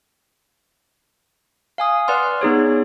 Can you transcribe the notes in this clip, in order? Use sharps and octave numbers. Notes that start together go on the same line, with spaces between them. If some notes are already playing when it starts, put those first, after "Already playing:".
F5 G#5 D#6
B4 D5 F#5 C6 F6
B3 D#4 G#4 C#5